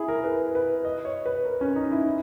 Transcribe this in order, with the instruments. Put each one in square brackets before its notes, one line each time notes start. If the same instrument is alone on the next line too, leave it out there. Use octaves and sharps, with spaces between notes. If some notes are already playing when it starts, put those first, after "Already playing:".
Already playing: [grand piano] E4 G#4
A#4
B4
B4
D#5
C#5
B4
A#4
C#4
D#4
E4
E4